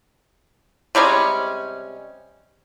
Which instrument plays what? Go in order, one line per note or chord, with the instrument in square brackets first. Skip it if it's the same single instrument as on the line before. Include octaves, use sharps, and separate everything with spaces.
[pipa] C3 G3 G#3 C#4